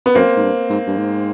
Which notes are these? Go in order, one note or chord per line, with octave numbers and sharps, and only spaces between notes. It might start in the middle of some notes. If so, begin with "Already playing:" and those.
B3
F#2 A#3 C4
G#2
G2
G#2
G2
G#2